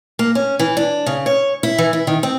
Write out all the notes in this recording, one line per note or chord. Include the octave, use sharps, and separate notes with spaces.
A#3
C#4
E3
D4
C#3
C#5
E4
E3
E4
D#3
C4